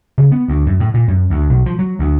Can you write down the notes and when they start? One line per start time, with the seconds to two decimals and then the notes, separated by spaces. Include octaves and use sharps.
0.18 C#3
0.32 B3
0.48 D2
0.66 F#2
0.80 A2
0.94 A#2
1.08 F#2
1.30 D2
1.50 B1
1.66 F3
1.79 F#3
1.99 D2